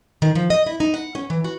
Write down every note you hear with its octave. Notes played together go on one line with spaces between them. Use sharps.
D#3
F3
D#5
E4
D#4
F#5
C#4
E3
F#4